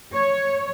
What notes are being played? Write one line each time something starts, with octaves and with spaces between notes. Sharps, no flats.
C#5